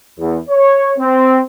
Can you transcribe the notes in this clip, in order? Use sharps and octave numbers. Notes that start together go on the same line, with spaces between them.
E2
C#5
C4